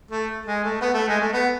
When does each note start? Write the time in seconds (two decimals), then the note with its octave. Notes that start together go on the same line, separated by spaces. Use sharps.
0.11 A3
0.46 G#3
0.64 A3
0.81 B3
0.94 A3
1.08 G#3
1.20 A3
1.33 B3